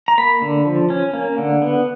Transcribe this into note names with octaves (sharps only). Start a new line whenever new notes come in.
A#5
A#3 B5
D3
F3
C#4
A#3
D3
B3